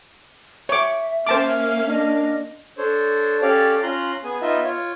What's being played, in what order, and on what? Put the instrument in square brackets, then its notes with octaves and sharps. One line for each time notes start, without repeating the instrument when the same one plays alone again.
[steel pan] C#5 D6 [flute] E5
[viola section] A#3 C#4 F5 [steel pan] C5 A5 D6
[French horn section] D4 [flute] D#5
[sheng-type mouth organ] D4 A4 C5 C#5
C#4 G4 A4 C#5 D5 F5
C#4 F4 A#5 C6 F#6
B3 G#4 G#5
B3 D#4 F4 D#5 E5
F4 C#5